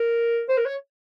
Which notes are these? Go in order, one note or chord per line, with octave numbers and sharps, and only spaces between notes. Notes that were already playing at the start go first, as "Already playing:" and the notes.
Already playing: A#4
C5
A#4
C#5